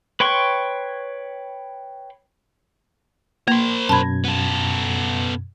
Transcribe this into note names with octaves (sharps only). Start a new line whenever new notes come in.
B4 C#5 G5 C6 C#6
A#3 A#4 C5
F#2 B2 A5 B5 G#6
B3 A4